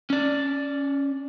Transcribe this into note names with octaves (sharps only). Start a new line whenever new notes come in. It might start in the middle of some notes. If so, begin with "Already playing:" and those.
C#4 D5